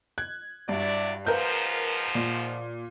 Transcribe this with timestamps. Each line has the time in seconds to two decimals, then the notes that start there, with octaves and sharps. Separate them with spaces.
0.18 F#6 G#6
0.69 G2 F#3 E4 D5
1.26 D#2 G#2 F3 A#4 B4 G6
2.15 A#2